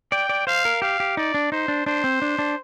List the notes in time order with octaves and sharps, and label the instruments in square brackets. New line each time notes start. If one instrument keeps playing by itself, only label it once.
[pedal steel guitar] D5 [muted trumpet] G5
[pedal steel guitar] D5
[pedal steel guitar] C5 [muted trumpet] F5
[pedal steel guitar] A#4
[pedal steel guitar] G4 [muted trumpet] F5
[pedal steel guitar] G4
[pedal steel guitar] D#4 [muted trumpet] D5
[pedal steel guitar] D4
[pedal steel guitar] D#4 [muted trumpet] C5
[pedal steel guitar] D4
[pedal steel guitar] D4 [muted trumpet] C5
[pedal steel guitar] C4
D4
D4